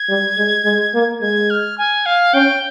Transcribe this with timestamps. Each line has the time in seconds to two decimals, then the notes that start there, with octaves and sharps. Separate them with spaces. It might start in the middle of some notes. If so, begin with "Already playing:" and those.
Already playing: G#6
0.09 G3
0.38 G#3
0.65 G#3
0.94 A#3
1.21 G#3 G#6
1.50 F6
1.78 G#5
2.06 F5
2.34 C#4 G5